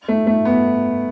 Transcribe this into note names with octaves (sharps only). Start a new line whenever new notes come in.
A3
A3
B3